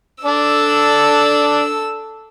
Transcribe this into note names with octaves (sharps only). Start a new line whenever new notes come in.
D4 A4 D5 E6